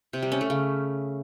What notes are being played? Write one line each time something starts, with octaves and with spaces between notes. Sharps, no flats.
C3
G3
C#4
A3
C#3